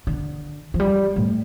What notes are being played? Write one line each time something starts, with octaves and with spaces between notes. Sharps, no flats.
D3
F3
G3
A2